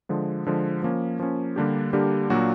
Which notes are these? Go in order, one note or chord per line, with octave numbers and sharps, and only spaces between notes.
D3 F3 G#3
D3 F3 G#3
F3 A#3 C#4
F3 A#3 C#4
D3 G3 A#3 D4 G4
D3 G3 A#3 D4 G4
A#2 F#3 A#3 D4 F#4